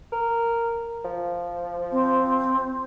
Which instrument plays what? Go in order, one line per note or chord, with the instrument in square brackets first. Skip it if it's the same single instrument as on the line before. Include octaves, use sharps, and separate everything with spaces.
[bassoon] A#4
F3
[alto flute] C4